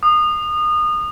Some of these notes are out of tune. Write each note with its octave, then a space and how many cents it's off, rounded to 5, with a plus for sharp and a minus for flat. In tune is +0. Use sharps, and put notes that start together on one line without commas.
D#6 -30